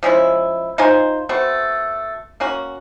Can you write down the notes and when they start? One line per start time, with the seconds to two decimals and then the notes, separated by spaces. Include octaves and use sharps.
0.03 F3 G#3 C#4 E4
0.78 D#4 F4 C5 G#5
1.29 A3 B3 C4 F#4
2.40 A#3 C#4 F#4